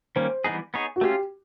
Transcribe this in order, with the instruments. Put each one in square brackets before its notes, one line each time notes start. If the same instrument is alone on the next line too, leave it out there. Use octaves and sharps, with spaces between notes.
[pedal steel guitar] D#3 G3 A#3 C#4 [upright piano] C5
[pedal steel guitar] E3 G3 B3 D#4 G#4
B3 D#4 G#4 C#5
[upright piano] F#4
[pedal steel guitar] A3 C#4 F4 [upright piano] G4